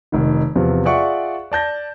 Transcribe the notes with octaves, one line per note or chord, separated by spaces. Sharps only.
F1 D#3
E2 C3 F3
F4 G#4 D5 E5 F#5 C#6
D5 A5 G6 A#6